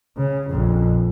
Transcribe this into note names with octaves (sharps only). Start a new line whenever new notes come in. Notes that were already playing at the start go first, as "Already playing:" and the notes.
C#3
A#1 F2